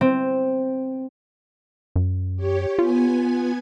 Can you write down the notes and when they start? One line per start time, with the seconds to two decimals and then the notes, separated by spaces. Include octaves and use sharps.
0.01 C4
1.96 F#2
2.36 G4 C#5
2.79 B3 F4 G#5 G#6